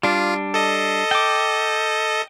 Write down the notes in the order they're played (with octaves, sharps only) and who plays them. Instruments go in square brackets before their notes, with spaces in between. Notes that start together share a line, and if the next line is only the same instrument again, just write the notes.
[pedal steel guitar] G3 D4 [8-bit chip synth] F4
[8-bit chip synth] A4 D#5
[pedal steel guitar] G5 D6